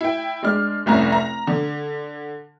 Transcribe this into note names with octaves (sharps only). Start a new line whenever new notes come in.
E4 G5
G#3 D4 F6
F1 C2 C#4 A#5
A#5
D3